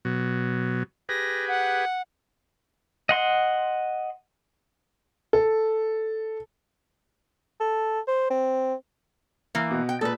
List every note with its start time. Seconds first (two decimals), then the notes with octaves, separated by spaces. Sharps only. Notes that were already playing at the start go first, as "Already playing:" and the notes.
0.05 B2 F#3
1.09 G4 G#4 B4 A#6
1.48 F#5
3.09 D#5 F#5 C6
5.33 A4
7.60 A4
8.08 C5
8.31 C4
9.55 E3 A#3
9.71 B2 F#4
9.89 G5
10.01 A#2 G#4 A4 B4